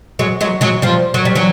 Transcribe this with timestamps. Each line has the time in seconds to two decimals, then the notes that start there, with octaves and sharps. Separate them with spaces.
0.19 F#3 G#3
0.41 F#3 G#3
0.61 F#3 G#3
0.82 F3 G3
1.14 F#3
1.25 G3
1.35 E3 F#3